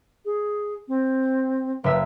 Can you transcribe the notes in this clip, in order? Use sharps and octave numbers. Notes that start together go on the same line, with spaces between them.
G#4
C4
F#1 B4 E5 E6